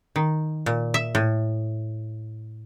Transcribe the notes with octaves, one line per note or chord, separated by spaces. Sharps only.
D#3
A#2
E5
A2